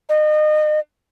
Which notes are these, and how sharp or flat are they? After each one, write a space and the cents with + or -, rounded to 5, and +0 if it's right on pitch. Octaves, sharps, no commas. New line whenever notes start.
D#5 -30